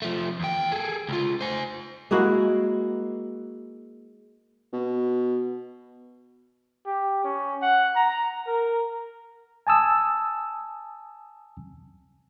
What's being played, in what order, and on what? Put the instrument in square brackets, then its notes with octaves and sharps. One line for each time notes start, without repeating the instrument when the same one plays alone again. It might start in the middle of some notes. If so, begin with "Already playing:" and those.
[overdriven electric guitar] F3 A3
E2 G5
G#4 A4
C#2 F4
C5 G#5
[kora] G#3 A#3 E4 F#4
[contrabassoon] B2
[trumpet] G4
C#4
F#5
A#5
A#4
[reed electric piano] G#5 A5 D#6 E6